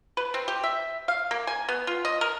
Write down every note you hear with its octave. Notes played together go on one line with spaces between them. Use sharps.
B4
C4
G4
E5
F5
A#3
G#5
B3
F4
D#5
A#4